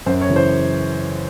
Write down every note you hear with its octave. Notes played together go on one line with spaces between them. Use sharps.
F#2 C5
C#5
C#3 E3
C5